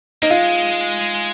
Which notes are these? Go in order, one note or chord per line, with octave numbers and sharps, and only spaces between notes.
A#3 D#4
G#3 F4